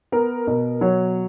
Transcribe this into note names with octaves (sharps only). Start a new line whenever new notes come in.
B3 A#4
B2 A#4
F#3 C#5